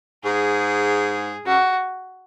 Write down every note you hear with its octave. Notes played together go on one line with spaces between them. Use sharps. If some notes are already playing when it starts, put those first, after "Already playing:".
G#2 G#4
F#2 F#4